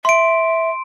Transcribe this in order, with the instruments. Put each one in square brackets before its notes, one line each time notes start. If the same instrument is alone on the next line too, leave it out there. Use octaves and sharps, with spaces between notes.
[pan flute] E5 [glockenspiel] C6 D7